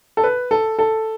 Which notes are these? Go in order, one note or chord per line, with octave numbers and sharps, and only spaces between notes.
A4
B4
A4
A4